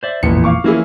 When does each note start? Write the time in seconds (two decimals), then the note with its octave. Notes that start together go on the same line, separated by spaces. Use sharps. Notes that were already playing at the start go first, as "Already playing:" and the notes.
0.03 C5 D5 E5
0.23 E1 A1 F2 A#2 E3 C#7
0.44 F5 C#6 D6
0.64 E3 F3 A#3 C#4 E4 G#4